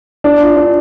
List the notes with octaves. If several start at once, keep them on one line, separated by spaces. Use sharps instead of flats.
D4
F4
D4